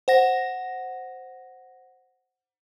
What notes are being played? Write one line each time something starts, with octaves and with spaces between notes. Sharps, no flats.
C5 F#5 A#6